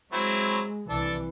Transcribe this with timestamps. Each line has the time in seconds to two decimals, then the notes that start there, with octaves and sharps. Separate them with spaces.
0.13 F#3 G#3 C4 E4
0.89 C2 E3 D4 A4